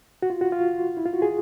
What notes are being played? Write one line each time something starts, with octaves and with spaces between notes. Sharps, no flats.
F#4
F4
F#4
F4
E4
F4
F#4
G#4